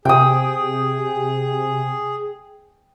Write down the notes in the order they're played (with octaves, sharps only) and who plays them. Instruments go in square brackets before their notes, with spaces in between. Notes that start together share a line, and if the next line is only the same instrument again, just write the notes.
[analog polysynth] C3 [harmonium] G#4 [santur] G5 D#6